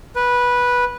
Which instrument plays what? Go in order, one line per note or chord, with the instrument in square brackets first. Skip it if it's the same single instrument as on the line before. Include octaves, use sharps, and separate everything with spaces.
[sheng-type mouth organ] B4